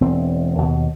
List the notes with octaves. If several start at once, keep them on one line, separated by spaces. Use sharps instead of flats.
E1 E2 C4
D#2 B2